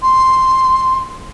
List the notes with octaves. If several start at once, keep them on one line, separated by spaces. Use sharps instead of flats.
C6